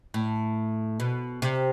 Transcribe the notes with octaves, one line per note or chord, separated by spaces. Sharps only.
A2
B2
C3